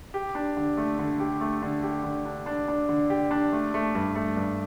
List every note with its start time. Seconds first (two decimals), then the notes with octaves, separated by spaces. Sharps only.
0.14 G4
0.35 D4
0.57 D3
0.77 A3
0.99 D3
1.20 G4
1.41 A3
1.63 D3
1.83 G4
2.04 D3
2.25 D4
2.46 D4
2.68 D4
2.89 D3
3.10 G4
3.31 D4
3.52 A3
3.74 A3
3.95 G2
4.15 A3
4.37 G2